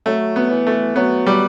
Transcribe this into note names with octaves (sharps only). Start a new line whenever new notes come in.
F#3 A3
B3
E3
A3
F#3 B3
G3